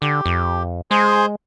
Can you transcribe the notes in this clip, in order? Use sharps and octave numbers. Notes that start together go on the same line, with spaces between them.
D3 G4
F2
G#3 G#4 C5 C6